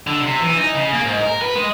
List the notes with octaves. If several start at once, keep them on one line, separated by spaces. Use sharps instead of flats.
D3
C3
E3
D#4
C#3
A#3
G#2
A#4
B4
G#3